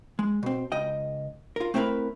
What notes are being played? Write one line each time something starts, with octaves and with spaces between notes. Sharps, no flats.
G#3
B2 C4
C#2 D#5 G5
F4 A#4
A3 C4 E4 F#4 A#4 B4